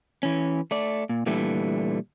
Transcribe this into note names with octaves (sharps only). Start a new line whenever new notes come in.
E3 C#4
A3 D5
A#2
A#2 D3 E3 G3 A3